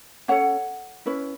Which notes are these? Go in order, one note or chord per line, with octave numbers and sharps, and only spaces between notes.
C#4 A4 C#5 F#5
C#4 E4 B4